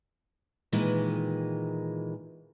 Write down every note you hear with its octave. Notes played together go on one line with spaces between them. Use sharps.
A#2 D#3 E3 G#3